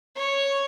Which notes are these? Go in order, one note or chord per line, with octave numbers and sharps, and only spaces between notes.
C#5